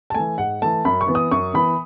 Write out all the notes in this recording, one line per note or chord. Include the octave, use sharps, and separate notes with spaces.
A5
E3 A3 G#5
G#2 F#5
E3 A3 A5
F#2 B5
C#6
E3 B3
D#6
F#2 C#6
E3 B3 B5